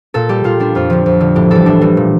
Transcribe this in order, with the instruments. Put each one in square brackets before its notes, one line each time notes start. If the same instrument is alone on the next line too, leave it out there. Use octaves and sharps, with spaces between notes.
[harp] A#2 A4
G3 G4
A#2 F4
G3 D4
F2 F4
D3 F3
F2
D3 F3
A2 G4
E3 G3 A4
A2 D4
E3 G3
A#2